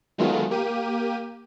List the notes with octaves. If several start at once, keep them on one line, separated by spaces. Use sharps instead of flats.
D#3 F#3 G#3 A3 B3 F4
A#3 G4 D#7